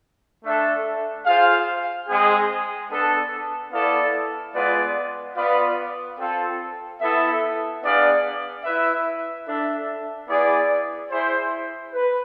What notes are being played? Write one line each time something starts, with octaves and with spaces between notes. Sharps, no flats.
A3 D4 A4 E5
F4 G#4 C5 F5
G#3 C4 G#4
B3 D4 A4
B3 E4 A4 D5 F5
G#3 B3 F4 B4 D5
B3 F4 B4 D5 F5
C4 F4 A4
B3 E4 A4 E5
B3 D4 G#4 D5 F5
E4 B4 E5
D4 A4 E5
B3 E4 G#4 D5
E4 G#4 C5
B4